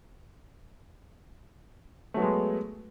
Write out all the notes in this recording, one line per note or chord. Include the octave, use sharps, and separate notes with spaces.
F#3 G#3 A3 B3